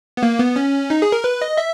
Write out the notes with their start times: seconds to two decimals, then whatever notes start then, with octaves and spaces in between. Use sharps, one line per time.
0.17 B3
0.23 A#3
0.39 B3
0.56 C#4
0.90 D#4
1.02 G#4
1.12 A#4
1.24 B4
1.41 D#5
1.57 E5